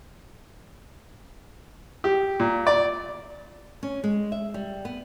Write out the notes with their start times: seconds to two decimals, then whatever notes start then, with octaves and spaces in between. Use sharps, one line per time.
2.04 G4
2.40 A#2
2.67 D5
3.83 C#4
4.04 G#3
4.32 E5
4.54 G3
4.85 B3